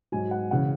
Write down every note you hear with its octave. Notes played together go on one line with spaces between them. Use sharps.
G#2 F#3 G#5
F#5
C#3 E3 F#5